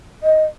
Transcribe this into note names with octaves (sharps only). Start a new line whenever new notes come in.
D#5